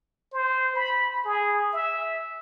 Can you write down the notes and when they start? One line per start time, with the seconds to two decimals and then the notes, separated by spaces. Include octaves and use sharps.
0.33 C5
0.75 B5
1.25 G#4
1.73 E5